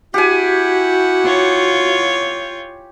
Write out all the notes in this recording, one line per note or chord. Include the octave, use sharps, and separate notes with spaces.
E4 F#4 G4 F#5 G#5
F4 C#5